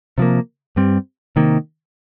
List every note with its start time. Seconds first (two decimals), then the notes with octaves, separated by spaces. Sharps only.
0.18 C3 F3 A#3
0.76 G2 G3 C4
1.36 C3 D#3 A#3